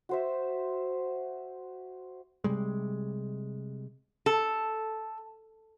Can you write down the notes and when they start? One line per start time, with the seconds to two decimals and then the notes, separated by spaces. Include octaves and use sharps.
0.09 F#4 C5 E5
2.44 C3 G3 G#3
4.26 A4